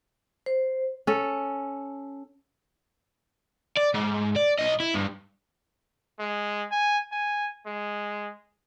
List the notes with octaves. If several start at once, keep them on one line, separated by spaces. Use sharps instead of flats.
C5
C#4 A4
D5
G#2
D5
B1 D#5
E4
G2
G#3
G#5
G#5
G#3